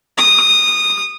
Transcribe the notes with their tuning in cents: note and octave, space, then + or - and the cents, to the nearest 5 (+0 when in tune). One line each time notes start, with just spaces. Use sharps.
D#6 -15